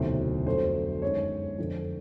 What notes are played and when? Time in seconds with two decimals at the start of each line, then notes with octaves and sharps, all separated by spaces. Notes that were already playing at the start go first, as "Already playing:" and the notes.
Already playing: E1 D2 C3 D#3 F#3 C5
0.46 F2 D3 F#3 A3 C5
1.02 F#2 D#3 G#3 C#5
1.58 F2 D3 F3